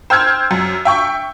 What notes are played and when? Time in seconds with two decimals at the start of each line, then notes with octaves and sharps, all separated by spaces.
0.10 C5 G5 E6 F6 G#6
0.51 F#2
0.85 E5 G5 C#6